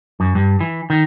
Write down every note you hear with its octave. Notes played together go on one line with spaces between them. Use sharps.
F#2
G2
E3
D#3